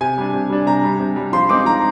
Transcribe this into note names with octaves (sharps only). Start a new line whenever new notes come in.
C3 G#5
G3 D4
C3
G3 D4
C3 A#5
G3 D4
C3
G3 D4
F3 C6
G#3 C4 D#4 D6
F3 A#5